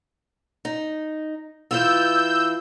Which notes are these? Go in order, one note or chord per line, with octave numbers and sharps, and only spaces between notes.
D#4
E3 E4 F4 E6 G6